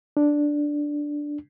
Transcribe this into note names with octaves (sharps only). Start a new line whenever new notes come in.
D4